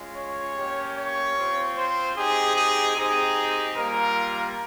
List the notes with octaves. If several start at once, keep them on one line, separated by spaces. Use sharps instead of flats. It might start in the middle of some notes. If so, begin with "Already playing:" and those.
Already playing: G#3 C#4 F4
C#5
A#3 C#4 G4
C#5
C4 F4
C5
C4 D#4 G4 G#4
G#4
C4 D#4 G4 G#4
G3 A#3 F4 A#4